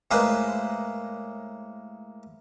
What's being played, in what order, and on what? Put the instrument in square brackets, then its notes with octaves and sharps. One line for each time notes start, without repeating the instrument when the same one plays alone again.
[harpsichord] A2 G#3 A#3 B4 C5